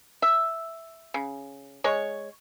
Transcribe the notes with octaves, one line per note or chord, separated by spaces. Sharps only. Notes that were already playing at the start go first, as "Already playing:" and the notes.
E5
C#3
G#3 C#5 C#6